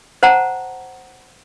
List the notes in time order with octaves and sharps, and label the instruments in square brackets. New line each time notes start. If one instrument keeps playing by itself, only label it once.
[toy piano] C5 F#5 A5 A#5